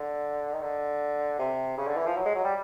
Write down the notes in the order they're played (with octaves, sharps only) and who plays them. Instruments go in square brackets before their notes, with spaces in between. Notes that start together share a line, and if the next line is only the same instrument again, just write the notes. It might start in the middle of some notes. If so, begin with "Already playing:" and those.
Already playing: [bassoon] D3
D#3
D3
C3
C#3
D3
E3
F3
F#3
G#3
F#3
G3